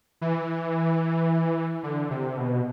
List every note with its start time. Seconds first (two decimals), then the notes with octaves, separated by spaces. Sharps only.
0.21 E3
1.83 D3
2.11 C3
2.37 B2